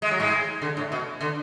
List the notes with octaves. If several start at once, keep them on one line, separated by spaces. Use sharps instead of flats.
G#3
F#3
G#2 G#3
D3
A2
B2
D3